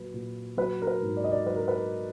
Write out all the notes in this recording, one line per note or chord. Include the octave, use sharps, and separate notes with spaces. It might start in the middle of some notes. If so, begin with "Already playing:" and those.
Already playing: A#2 F#3 B4
A#2
F#3 B4
A#4
B4
G#2
D5
D#5
D5
F#3 B4
A#4
B4